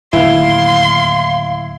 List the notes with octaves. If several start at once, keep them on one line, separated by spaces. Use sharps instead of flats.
D1 D#2 E4 F5 C6